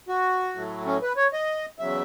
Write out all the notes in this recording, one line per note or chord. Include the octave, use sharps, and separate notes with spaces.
F#4
A2 F#3 A3
C#4
B4
C#5
D#5
E2 C#3 F#3 E5